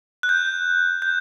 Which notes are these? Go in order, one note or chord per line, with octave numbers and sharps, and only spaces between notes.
F#6
G6
G6